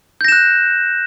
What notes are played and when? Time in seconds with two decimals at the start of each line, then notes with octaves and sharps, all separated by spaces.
0.21 G6
0.24 A#6
0.28 E7
0.32 F#6